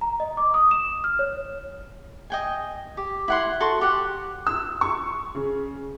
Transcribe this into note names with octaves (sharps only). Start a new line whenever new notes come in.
A#5
D#5
D6
D#6
E7
F6
C#5
D#5 G5 G#5
G4
E4 F#5 C6
F#4 A4 C6 C#6
G4 F#5
E6
C#6
C#3